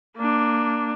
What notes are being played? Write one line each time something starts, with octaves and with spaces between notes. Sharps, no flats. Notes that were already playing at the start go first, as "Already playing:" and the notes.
A#3 D4